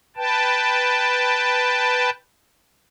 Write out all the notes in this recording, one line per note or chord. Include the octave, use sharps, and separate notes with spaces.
B4 G5 A5